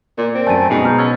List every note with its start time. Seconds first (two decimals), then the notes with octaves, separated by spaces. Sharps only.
0.18 A#2 A#4 D5
0.35 C4
0.47 F#2 A3 G#5 A6 D#7
0.70 G#2 B2
0.84 A#5 F6 G6
0.98 C#4 E6 G#6 A6